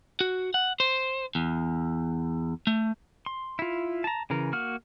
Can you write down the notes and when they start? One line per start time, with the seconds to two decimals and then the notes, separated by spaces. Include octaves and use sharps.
0.21 F#4
0.54 F#5
0.80 C5
1.35 E2
2.67 A3
3.26 C6
3.59 E4 F4
4.04 A5 A#5
4.30 C#3 E3 A#4
4.53 A#3 F#4 F6